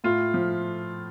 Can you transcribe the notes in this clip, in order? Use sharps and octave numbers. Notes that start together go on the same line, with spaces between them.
A2 F4
F3